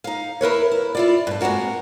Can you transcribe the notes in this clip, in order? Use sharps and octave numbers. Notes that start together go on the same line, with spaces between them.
D#4 F5
E4 A#4 B4 C#5
E4
E4 F4 D5
G2 A4
G#3 A#3 C4 F#4 A#4